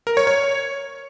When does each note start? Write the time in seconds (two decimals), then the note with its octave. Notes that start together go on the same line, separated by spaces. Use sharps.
0.07 A#4
0.17 C#5
0.27 C#5